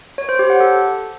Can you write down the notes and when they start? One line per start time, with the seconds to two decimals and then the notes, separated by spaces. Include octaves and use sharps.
0.18 C#5
0.29 C5
0.39 G4
0.50 F#5
0.60 A4